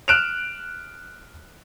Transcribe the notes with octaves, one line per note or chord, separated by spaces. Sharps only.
F6 F#6 D7 E7 F7